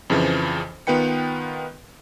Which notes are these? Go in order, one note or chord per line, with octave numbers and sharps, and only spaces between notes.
F2 C#3 E3 F3
D#3 B3 F4 B4 G5 C#7